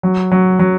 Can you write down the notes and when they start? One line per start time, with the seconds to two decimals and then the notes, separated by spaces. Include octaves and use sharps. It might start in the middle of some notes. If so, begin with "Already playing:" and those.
0.03 F#3
0.31 F#3
0.59 F#3